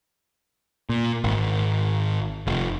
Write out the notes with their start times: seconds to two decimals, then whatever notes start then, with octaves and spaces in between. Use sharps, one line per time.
0.89 A#2
1.24 G#1
2.47 F1